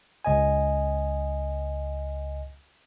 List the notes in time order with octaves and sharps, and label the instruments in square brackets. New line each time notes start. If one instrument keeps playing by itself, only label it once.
[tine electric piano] C#2 D#5 G#5